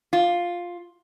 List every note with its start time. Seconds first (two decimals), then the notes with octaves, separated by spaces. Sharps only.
0.13 F4